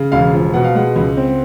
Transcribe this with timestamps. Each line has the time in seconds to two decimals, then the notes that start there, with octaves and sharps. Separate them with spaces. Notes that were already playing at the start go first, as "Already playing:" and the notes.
Already playing: C#3
0.12 E1 F5
0.33 F3
0.54 B2 F#5
0.64 F5
0.75 G#3 F#5
0.96 C#2
1.17 C4